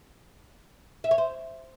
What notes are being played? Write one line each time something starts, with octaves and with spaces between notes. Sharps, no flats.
E5
C#5
C5